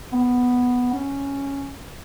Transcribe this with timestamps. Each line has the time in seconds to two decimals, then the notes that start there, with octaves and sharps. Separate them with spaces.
0.12 B3
0.92 C#4